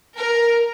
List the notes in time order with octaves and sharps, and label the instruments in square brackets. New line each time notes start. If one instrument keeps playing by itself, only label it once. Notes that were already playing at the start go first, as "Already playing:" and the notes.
[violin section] A#4